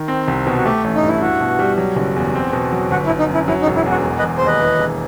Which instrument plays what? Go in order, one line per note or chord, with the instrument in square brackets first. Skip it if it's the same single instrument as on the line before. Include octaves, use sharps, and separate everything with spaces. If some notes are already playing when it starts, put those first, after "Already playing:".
Already playing: [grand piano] D#3
C4
C2
B2
[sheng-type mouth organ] F#4
[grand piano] A3 [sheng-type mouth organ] G4
[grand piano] A1
[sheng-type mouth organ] D#4
[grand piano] G2
[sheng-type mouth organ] E4
[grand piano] E4 [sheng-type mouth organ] F#4
[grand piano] B2
G3
F#3
F#1
E2
C4
B2
F#3
[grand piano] G1 [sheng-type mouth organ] F#4
[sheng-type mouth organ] E4
[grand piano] G1
[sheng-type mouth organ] D#4
[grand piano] F#2 [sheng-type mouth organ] E4
[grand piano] F#3 [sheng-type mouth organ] E4
[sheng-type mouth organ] D#4
[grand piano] E1
[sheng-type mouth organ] E4
[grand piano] E2 [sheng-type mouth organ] F#4
[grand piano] E1
[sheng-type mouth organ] B4 D#5
[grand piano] E1
[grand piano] D#2 [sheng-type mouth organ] C5
[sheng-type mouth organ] B4 D#5
[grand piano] E3
E1